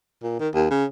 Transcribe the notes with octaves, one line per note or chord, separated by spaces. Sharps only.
A#2
D#3
D#2
C#3